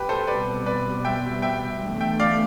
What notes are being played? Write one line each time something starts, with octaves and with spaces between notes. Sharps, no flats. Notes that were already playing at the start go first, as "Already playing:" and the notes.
Already playing: C2 B2 G4 B4
A4 C5
B2 G3 C4 B4 D5
B4 D5
E5 G5
E5 G5
E2 D3 A3
E5 G5
D5 F5